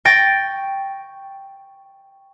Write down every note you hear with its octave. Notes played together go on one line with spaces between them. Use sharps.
G5 C#6 A6 A#6 D7